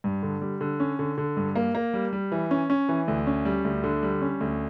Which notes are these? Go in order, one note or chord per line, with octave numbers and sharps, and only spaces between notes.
G2
D3
G3
D3
C#4
D3
D3
G2
A#3
A#3
G3
G3
E3
C#4
C#4
E3
D2
C#4
G3
D2
D3
G3
C#4
D2